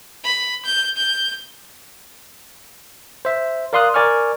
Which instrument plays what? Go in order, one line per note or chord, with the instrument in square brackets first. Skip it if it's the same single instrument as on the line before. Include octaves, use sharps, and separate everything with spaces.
[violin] B5
G6
G6
[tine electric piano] C5 E5
A#4 D5 F5 C6 D#6 F#6
A#4 D5 G#5 C#6 F6